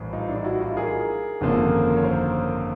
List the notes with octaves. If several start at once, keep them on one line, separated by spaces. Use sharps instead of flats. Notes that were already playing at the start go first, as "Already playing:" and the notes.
Already playing: A#1 A2 E3 G3
D#4 F4
D4 E4
E4 F#4
D#4 F4
G#4 A#4
G#1 F#2 D3 F3 A#3
C#5
A#4 C5